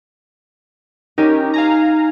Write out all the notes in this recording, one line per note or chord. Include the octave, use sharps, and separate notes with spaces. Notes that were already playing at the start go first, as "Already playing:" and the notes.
C#4 D#4 G4 A#4 D#5
F5 G#5 A#5